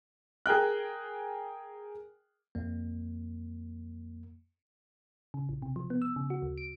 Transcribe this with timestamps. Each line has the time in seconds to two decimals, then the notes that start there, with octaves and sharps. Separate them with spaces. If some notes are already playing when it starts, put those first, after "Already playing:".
0.46 G#4 A#4 G5 F#6
2.55 F2 A#3
5.34 C#3
5.49 A1
5.62 C3
5.76 F3
5.90 B3
6.02 E6
6.16 C#3
6.30 F#4
6.42 D2
6.58 D7